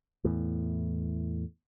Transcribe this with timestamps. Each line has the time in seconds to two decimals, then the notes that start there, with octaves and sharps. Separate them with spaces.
0.24 E2 A2